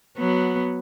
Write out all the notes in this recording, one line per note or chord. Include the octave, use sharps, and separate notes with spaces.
F#3 B3